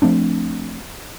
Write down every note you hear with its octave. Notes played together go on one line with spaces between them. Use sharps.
F3 A3 C4 D4